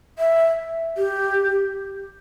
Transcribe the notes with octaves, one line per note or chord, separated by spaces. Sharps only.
E5
G4